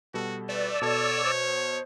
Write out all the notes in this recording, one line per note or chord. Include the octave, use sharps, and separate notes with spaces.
B2 G3 F#4 A4
A3 B4 D5 E6
B2 A4 C#5 A5 G#6
C5